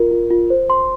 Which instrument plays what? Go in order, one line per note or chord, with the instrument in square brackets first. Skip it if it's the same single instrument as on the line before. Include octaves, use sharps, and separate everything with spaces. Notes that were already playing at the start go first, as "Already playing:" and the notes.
Already playing: [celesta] F4 A#4
F4
F4
C5
C6